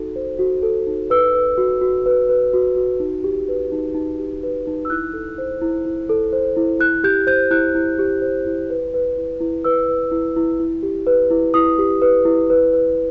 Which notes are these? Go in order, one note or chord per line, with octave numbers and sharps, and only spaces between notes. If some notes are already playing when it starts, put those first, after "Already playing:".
Already playing: D#4 F#4 A4
C5
F#4
A4
D#4
B4 E6
B4
F#4
F#4
B4
B4
F#4
F#4
D#4
G4
B4
D#4
D#4
G4
B4
D#4
E6
E4 F#6
A4
C5
E4
E4
A4
C5
E4
E4 F#6
G4 G6
C5 G6
E4 F#6
E4
G4
C5
E4
B4
B4
E4
E4
B4 E6
B4
E4
E4
E4
G4
B4
E4
E4 D#6
G4
B4
E4
B4
B4